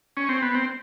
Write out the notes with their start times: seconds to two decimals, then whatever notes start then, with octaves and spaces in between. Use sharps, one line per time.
0.17 C#4
0.29 C4
0.42 B3
0.55 C4